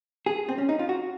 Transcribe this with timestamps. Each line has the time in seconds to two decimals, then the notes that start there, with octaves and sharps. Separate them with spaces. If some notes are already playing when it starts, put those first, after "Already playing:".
0.26 G#4
0.49 C4
0.58 C#4
0.69 D#4
0.79 F4
0.89 F#4